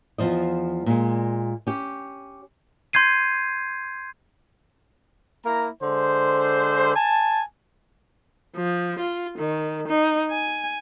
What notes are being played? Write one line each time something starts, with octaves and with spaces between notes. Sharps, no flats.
E2 F3 C5 D#5
A#2 G#3
C#4 G4
C6 G6 G#6 C7 D#7
A#3 E4 A#5
D3 G#3 C5
G#5 A5
F3
F4
D#3
D#4
G#5